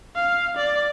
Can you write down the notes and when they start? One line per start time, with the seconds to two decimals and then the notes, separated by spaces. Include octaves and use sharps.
0.16 F5
0.57 D5